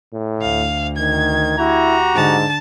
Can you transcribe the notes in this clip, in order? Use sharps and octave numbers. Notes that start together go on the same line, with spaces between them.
A2
D2 F5
D#3 G#6
E4 F#4 G4 A#5
G#2 D3 A5